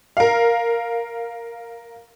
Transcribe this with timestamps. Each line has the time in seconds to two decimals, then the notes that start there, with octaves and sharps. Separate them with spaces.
0.17 A#4 F5